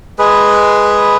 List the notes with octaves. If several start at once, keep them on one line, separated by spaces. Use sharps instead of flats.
G#3 G#4 B4